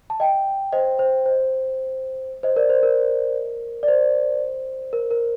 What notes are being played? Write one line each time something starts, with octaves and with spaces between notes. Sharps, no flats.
A5
D#5 G5
C5 D#5
C5
C5
C5 D#5
A#4 D5
C5
A#4
D5
C5
A#4
A#4